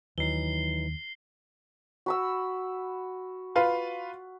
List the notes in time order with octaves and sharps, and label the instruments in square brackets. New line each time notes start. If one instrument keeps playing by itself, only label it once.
[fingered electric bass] D#2 [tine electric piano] E3 F#3 D#4 [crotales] C7 G7
[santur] F#4 B5 E6
[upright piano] F4 B4 F5